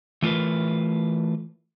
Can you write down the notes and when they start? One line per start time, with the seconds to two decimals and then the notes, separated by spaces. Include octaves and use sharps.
0.22 E3 A3 F4 A#4 B4